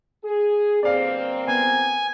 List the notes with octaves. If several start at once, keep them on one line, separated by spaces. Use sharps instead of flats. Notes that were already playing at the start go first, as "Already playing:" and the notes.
G#4
G1 A#3 C4 D5 F5
B3 G#5